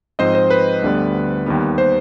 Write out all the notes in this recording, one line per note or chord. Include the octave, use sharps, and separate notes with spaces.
G#2 F3 C4 C5 D#5
C5
B4
D2 D3 G3 B3
D#2 D#3 G3 B3
C5